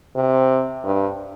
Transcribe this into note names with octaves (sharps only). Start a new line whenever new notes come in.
C3
G2